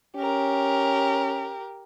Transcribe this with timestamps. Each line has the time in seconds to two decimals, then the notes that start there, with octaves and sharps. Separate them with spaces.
0.16 C#4 G4 A#4